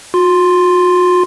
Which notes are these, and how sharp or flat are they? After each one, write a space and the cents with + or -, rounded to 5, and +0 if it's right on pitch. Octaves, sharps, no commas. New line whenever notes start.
F#4 -40 C6 +0